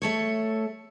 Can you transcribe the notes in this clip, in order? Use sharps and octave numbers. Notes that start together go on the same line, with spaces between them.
A3 A4 C#5